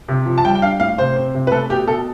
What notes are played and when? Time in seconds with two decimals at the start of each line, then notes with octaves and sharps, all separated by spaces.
0.08 C3
0.26 F3
0.38 A5
0.44 G3 G5
0.55 G5
0.62 D4 F5
0.80 A2 F5
0.98 C3 C5
1.16 C4
1.34 C3
1.47 B4
1.52 A3 A4
1.69 B2 G4
1.88 B2 A4